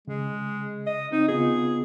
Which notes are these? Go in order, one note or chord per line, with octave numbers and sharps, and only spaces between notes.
C#3 G#3
D#5
C4 D#4
C#3 B3 F4 G#4